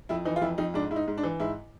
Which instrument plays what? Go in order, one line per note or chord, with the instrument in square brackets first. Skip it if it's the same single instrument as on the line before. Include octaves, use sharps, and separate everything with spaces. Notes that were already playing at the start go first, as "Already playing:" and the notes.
[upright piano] F2 E4
E3 D#4
F4
F2 E4
F2 D#4
G#2 D4
G#2 E4
D#4
G#2
D4
E3
G#2 E4